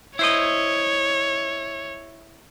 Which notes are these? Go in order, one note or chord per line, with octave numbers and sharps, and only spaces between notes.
E4 C5 C#5 D#5